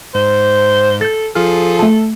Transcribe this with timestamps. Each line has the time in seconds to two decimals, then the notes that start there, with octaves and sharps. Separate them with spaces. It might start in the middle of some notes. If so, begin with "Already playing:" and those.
0.15 G#2 C5
1.01 A4 G6 A6
1.35 F3 F4 G#4 A4 F6
1.79 A3 A5